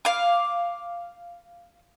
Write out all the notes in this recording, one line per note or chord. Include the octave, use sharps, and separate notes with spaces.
F5 D6